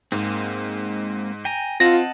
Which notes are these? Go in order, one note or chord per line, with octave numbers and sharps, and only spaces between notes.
G#2 G#3 A#3 C4
G5 G#5 A#5
C4 F4 D#5 F#5 A5 A#6